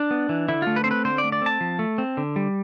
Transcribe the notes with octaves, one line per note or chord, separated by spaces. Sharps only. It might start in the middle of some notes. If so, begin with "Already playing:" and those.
Already playing: D4
B3
E3
D3 E4
A3 F4
B4
C4 C5
B4
D3 C5
D5
A3
D5
C4 A5
F3
A3
C4
D3
G3